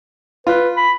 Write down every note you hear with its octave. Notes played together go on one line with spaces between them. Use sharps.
F4 B4
B5